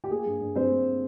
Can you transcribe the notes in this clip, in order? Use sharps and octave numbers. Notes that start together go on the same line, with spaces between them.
G4
A#3 G#4
G2
G2
G2 C4 C5
A#3